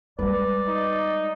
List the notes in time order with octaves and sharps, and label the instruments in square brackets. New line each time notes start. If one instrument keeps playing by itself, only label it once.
[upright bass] G3 G#3 [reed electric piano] B4 [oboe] D5
[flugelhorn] D#4